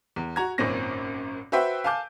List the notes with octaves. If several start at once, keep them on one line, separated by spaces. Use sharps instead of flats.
E2
F#4 A#5 G#6
G#1 F#2 A#2 C4 C#4 A#6
F#4 B4 C5 E5 G5 B5
F5 G#5 A5 D6 G6